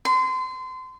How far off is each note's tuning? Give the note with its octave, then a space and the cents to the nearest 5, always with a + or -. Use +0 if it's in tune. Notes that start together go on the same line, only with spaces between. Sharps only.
C6 -30